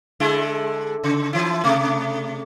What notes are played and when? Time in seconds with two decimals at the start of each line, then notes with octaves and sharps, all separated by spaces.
0.20 D3 G#3 E4
1.04 C#3
1.33 E3 E4
1.64 C3 A3